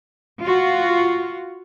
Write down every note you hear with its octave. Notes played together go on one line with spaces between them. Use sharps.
F4 F#4